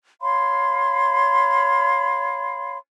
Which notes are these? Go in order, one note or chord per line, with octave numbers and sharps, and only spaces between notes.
C#5 F5 B5 C6